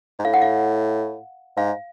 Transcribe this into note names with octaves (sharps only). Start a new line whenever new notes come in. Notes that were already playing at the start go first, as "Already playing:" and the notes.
G#2
A2 F5
F#5
F5
G#2 F5